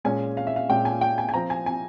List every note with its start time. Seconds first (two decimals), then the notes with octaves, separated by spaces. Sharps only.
0.05 A#2 G#3 C#4 G#5
0.37 F5
0.47 E5
0.56 F5
0.69 A#2 G#3 C#4 G5
0.85 G#5
1.01 G5
1.18 G#5
1.29 G#5
1.34 F3 C4 A#5
1.50 G#5
1.66 G#5